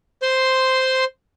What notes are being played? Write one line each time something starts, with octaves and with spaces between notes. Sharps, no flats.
C5 C6